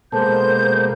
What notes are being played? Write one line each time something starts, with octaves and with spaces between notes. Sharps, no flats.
B2 G#3 A#3 A4 C5 A5 G6